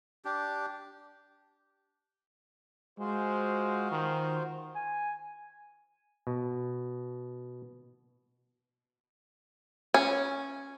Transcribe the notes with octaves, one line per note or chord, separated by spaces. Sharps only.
D4 G4
G#3 F4 F#4 C5
D#3
G#5
B2
C#4